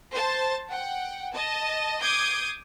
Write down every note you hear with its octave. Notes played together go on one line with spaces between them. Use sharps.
C5 A5
F#5 G5
D#5 A5
D6 D#6 G6 G#6 C7